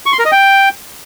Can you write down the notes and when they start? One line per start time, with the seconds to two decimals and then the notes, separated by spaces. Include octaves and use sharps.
0.06 C#6
0.12 C6
0.19 A#4
0.25 D#5
0.32 G5